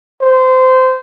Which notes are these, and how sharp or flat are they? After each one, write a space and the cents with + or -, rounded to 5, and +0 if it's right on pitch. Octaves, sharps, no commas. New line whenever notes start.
C5 -20